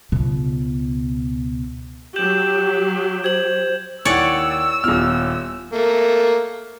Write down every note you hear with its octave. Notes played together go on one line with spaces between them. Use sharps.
C#2 B2
F#3 G4 G6 E7 F#7
C5 G#6 F#7
D#2 E4 C#5 D5 F#5 G#5 E6
D#1 B3 F4 F6
A3 A#3